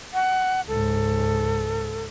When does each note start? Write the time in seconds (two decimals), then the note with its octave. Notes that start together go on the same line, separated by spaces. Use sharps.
0.14 F#5
0.68 C#2 G#2 A4